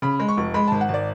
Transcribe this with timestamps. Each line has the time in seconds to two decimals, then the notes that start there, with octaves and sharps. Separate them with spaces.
0.02 C#3 B5
0.20 G#3
0.28 C#6
0.37 F1
0.54 G#3 B5
0.68 G#1 A5
0.81 F#5
0.89 G#1 D5